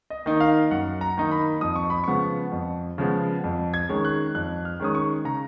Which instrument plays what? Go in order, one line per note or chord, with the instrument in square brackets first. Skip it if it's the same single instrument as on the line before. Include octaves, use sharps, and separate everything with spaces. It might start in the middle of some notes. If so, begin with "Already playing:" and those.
[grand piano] D#5
D#3 A#3 D#4
F5
F#2 F#5
A#5
D#3 A#3 D#4
B5
F2 D#6
C#6
B5
C#3 F3 G#3 B3 C#6
F2
C#3 F3 G#3 B3
F2
G#6
D#3 G#3 C#4
F#6
F2 F#6
F6
D#3 G#3 C#4 D#6
C#6
C#3 A#5